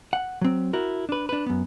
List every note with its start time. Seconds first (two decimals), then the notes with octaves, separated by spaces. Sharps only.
0.13 F#5
0.41 F#3 C4
0.73 E4 F#4 A#4
1.09 D4 B4
1.29 D4 B4
1.46 F#2 B3